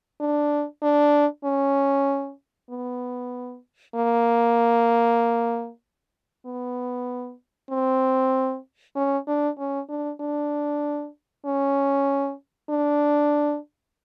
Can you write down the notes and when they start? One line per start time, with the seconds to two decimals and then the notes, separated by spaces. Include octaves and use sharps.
0.21 D4
0.82 D4
1.44 C#4
2.70 B3
3.95 A#3
6.46 B3
7.70 C4
8.96 C#4
9.27 D4
9.58 C#4
9.89 D4
10.20 D4
11.45 C#4
12.70 D4